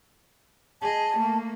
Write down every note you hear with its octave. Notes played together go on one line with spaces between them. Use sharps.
G#4 D#5 A5
A3 A#3